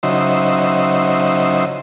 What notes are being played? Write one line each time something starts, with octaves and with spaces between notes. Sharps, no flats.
C#3 F#3 D#4 C5 E5